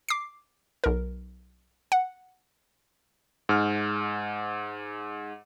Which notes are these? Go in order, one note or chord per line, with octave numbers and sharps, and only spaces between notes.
D6 C7
B1 A#4
F#5
G#2 F6